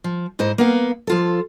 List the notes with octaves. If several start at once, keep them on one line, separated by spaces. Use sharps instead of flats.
F3
G#2 E4 C5 D#5
A#3 B3 F5
F3 F4 A4